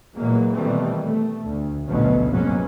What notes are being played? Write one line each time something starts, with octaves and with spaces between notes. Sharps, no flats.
A#2 E3 F#3 G#3 A#3
B2 D#3 E3 G3 A3 C4
A3
D2
A1 D2 B2 F3 F#3 C#4
F1 G#2 F#3 A#3 B3 C#4